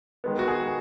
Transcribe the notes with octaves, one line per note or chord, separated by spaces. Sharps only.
D#3 G#3 B3
F#4
G#4